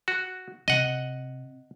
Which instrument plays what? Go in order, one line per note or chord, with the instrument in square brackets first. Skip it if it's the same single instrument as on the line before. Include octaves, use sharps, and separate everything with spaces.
[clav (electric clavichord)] F#4
[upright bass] C3 [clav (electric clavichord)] D#5 F#5